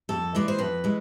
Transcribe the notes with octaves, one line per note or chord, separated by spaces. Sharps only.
F2 A4
E3 G#3 D5
C5
F2 B4
E3 G#3